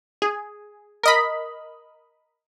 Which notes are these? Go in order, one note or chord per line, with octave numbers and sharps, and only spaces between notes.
G#4
A#4 D#5 B5